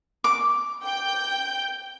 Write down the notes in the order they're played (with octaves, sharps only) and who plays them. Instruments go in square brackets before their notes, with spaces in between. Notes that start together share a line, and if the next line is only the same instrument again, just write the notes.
[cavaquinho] D6
[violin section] G5 G6